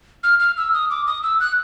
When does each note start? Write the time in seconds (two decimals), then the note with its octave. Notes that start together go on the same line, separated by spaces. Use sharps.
0.24 F6
0.40 F6
0.57 E6
0.74 D#6
0.90 D6
1.07 D#6
1.23 E6
1.40 F#6